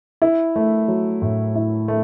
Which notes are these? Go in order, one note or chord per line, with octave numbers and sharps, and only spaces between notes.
E4
A3
F#3
A2
E4
A3